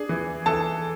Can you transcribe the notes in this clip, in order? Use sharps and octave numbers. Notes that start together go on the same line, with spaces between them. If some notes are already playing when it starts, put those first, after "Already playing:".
Already playing: D4 G#4
E3
E3 A4 A5